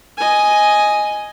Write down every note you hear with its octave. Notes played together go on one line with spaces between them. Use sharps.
D#5 G#5